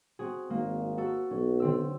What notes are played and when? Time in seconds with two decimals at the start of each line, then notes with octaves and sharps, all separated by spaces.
0.19 C4 F#4 G#4
0.50 G#1 A#3
0.98 F#4 A4
1.31 B1 C#4
1.60 D3 C4 E6